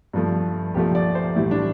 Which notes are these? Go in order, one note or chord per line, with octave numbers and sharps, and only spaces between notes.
G2 F3 A3
C2 A#2 F3 A3 G4
D5
C5
A2 E3 G3 E4
D4